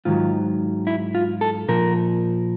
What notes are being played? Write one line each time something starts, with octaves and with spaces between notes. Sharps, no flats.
G#2 D#3 F#3 F4
E4
F4
A4
A#2 F3 A#4